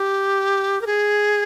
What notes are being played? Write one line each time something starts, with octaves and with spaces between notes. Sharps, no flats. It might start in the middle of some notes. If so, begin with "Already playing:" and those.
Already playing: G4
A#4
G#4